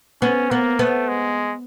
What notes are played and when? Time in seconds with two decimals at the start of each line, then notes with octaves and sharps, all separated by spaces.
0.22 B3 C#4
0.51 A#3 B3
0.79 A3 B3
1.08 G#3